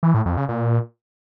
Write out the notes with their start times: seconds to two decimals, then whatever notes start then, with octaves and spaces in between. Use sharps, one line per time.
0.03 E3
0.14 A2
0.26 F2
0.37 C#3
0.49 A#2